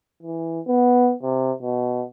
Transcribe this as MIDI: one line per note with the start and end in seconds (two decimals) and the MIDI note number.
0.23 0.60 52
0.67 1.13 59
1.23 1.52 48
1.62 2.04 47